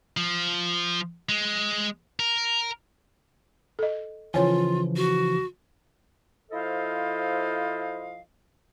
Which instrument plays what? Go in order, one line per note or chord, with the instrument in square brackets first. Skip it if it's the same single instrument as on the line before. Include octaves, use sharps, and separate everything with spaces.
[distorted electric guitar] F3
G#3
A#4
[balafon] A4 D#5
[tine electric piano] C#3 E3 F3 [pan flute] F4 [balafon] C#5 G#5
[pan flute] F#4
[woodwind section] F3 E4 A4 C5 D#5 F5